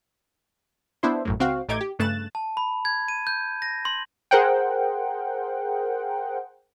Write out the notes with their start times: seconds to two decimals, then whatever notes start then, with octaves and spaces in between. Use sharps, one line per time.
1.03 B3 D4 E4 C5
1.25 A1 F#2 A2
1.40 C#2 C4 F#4 F5
1.69 A1 A3 D#4 D6 G6 G#6
1.81 G4
1.99 G2 C#3 A3 F#6 A6 E7
2.35 A5
2.57 B5
2.85 G#6
3.08 D#7
3.27 G6
3.62 A#6
3.85 C6
4.31 G#4 A#4 C5 F#5 G5